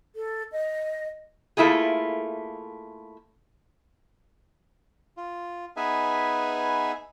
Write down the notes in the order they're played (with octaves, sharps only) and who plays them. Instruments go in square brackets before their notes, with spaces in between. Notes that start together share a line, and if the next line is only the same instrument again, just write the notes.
[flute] A4
D#5
[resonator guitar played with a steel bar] A3 A#3 E4 F4 G#4
[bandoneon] F4
B3 D#4 G#4 B4 E5 G#5